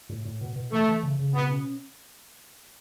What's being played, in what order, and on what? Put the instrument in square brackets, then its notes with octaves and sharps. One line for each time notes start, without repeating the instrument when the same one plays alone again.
[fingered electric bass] A2
A2
B2
B2
[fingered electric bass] E3 [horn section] A3
[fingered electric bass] E3
C#3
C#3
[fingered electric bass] B2 [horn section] B3
[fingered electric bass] C#4